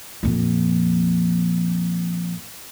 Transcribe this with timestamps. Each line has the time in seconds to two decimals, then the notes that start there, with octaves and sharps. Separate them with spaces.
0.23 F2 A#2